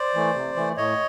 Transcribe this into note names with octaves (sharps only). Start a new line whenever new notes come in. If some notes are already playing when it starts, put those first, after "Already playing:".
Already playing: C5 D5
E3 A3
C3
E3 A3
A2 C#5 D#5